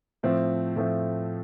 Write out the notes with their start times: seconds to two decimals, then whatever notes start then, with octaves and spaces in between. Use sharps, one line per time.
0.23 A2 F3 A3 C4
0.76 A2 F3 A3 C4